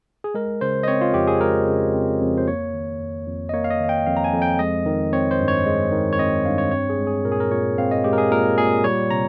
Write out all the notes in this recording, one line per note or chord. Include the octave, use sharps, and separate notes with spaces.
G#4
G#3 A#4
C#3 C5
D#5
C4 C#5
F4
F2 G4
G#4
G#3 A#4
C#3
C4
F2
C5
A#3 C#5
D#3
F2
F2
D#5
A#3 C#5
F5
D#5
D#3 F5
G5
F2 F5
A#5
G#5
F2
G5
G#3 D#5
D#3
C4 C#5
C5
G2
C#5
G#3
D#3
C#5
C4 D#5
G2 F5
C#5
C4 C#5
G#4
G#3
G#4
A#2 A#4
G#4
A#4
A#2 C#5
C4 F5
D#5
G#3 G4
A#4
G#4
A#2 A#4
A#2 G#4
G3 C#5
C3 A#5